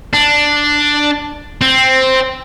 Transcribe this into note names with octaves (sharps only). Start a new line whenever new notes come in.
D4
C4